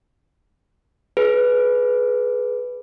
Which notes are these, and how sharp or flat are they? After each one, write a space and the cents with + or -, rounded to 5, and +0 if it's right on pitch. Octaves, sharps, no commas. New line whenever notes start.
G#4 +30 B4 +0